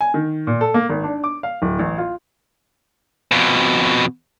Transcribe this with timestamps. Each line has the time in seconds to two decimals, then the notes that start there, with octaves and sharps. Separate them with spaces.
0.01 G#5
0.14 D#3
0.47 A#2
0.61 A4
0.74 A#3
0.90 G#1
1.04 D4
1.24 D6
1.43 F5
1.62 D1
1.79 A1
1.98 F4
3.32 F2 B2